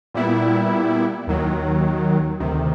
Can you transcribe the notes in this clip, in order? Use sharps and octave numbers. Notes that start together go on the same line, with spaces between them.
A#2 G3 B3 E4
D#2 D#3 F#3
D2 C3 D#3